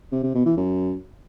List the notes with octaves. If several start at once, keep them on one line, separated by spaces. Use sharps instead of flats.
C3
C3
B2
E3
F#2